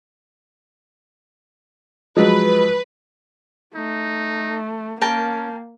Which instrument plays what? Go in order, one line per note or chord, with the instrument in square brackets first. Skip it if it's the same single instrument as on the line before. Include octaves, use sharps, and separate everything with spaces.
[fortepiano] F3 F#3 [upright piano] G#3 [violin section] B4
[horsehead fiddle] A3 [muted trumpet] D#4
[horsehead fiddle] A#3 [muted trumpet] C#4 [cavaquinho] A#4 G5 A5